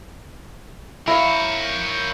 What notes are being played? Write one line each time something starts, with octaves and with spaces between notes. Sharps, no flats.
E4 A#4 C#5 F5